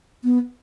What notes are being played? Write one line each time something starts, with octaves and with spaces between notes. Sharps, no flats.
B3